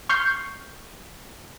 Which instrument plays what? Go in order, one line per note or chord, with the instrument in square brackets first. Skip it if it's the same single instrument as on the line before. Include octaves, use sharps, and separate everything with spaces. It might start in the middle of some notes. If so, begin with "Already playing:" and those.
[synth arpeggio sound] C#6 F6 G6 C7